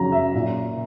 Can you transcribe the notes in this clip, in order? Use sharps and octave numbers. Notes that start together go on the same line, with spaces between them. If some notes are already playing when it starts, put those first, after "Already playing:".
Already playing: F#2 C#3 F#3 A#5
E5
A#2